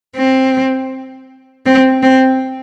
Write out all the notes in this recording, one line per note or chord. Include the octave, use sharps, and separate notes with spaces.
C4
C4
C4